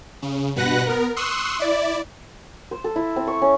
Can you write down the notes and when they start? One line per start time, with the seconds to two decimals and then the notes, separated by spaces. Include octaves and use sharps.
0.22 C#3
0.56 G2 B2 B4 F#5 F#6 A#6
0.86 B3 A#4
1.16 C6 C#6 D#6 E6 F#6
1.59 E4 D5
2.71 C5
2.84 A4
2.96 E4
3.16 C4
3.27 C#6
3.42 C#4